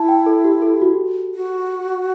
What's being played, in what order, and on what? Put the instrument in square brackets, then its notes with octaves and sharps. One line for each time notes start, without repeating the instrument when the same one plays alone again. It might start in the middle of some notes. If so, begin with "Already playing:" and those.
Already playing: [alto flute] E4 [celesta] A5
[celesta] G5
A4
G4
A4
G4
F#4
G4
[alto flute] F#4